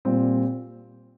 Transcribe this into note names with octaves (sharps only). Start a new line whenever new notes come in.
A#2 G3 C4